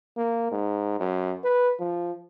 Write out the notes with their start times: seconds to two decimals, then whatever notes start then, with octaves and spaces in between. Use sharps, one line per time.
0.17 A#3
0.52 G#2
1.00 F#2
1.44 B4
1.80 F3